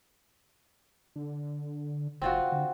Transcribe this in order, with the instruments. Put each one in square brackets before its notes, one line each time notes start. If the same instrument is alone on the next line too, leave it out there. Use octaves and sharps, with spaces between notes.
[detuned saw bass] D3
[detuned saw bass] F#1 [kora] C4 F4 F#4
[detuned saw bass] D3